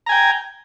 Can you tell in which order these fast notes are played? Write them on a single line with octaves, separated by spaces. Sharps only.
A#5 G#5 G5